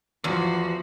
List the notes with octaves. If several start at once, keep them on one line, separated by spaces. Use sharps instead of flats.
E2 F3 F#4